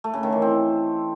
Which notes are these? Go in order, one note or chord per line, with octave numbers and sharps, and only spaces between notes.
A3
C#3
D#3
E3
C4